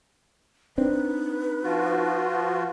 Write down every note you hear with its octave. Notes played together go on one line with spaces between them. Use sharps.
C4 D4 D#4 B4
F3 F4 F#4